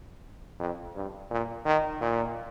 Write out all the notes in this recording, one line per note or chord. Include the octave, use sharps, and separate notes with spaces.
F2
G2
A#2
D#3
A#2